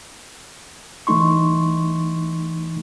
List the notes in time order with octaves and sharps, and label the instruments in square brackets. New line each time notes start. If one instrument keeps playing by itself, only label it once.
[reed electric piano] C2 E3 A3 D#4 C6 C#6